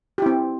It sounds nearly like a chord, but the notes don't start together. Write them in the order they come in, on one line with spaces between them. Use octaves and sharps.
G4 E4 C4